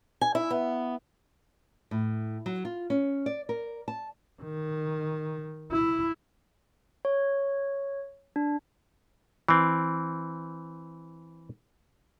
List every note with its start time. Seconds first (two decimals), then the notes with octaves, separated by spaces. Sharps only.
0.21 G#5
0.35 E4
0.51 B3
1.91 A2
2.46 F#3
2.65 F4
2.90 C#4
3.26 D5
3.49 A#4
3.88 A5
4.42 D#3
5.72 E4
7.05 C#5
8.36 D4
9.49 E3 C4